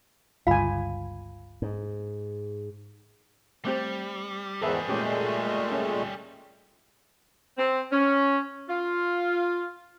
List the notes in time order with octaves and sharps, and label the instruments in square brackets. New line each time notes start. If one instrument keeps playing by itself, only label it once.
[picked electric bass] G1 C#2 G2 [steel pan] F4 G#5 [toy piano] F5 B5
[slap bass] G#2
[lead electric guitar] G3 [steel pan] A3 C4 G4
[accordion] E2 G#2 D#3 [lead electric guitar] G3 G#4 [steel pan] A4 B4 E5
[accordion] A#2 G#3 A3 [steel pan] C#4 G4
[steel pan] C#4
[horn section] C4
C#4
F4